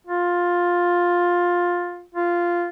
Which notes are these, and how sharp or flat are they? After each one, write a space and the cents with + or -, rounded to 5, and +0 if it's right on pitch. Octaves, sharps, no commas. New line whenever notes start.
F4 +10
F4 -5